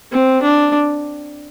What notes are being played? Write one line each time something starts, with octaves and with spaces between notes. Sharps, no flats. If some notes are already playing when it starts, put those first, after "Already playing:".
C4
D4